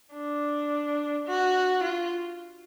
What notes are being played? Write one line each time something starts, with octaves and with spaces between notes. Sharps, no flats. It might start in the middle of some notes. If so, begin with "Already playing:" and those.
D4
F#4
F4